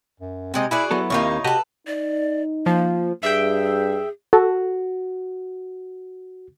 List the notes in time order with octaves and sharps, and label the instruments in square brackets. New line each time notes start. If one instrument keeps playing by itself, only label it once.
[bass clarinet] F#2
[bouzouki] C3 G#3 D#5 [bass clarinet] C4
[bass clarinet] E4 [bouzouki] F#4 G#4 D5
[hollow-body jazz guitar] F#3 B3 A4 [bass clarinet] E4
[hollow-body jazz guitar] D#2 C3 A#3 [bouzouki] D#4 F4 C#5
[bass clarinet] C3 [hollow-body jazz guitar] F#4 G4 D#5 [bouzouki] A4 B4
[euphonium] D#4 [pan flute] D5
[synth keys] F3 [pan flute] A#3
[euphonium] G2 [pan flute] G#4 [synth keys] E5 G5
[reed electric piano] F#4 [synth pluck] A4